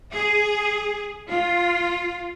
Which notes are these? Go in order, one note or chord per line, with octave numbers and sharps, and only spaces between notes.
G#4
F4